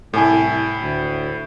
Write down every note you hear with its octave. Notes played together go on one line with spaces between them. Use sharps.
C2 A2 E4 A4 G#5 A5
D2